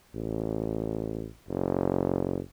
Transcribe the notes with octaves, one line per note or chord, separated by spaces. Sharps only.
A1
F#1